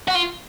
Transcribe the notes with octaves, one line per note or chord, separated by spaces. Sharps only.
F#4
F4